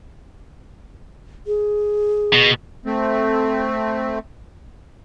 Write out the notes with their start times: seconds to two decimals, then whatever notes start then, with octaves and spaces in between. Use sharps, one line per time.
1.47 G#4
2.34 B2
2.86 A3 C4